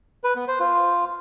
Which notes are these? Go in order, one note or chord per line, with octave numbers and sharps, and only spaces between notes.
B4
B3
C5
F4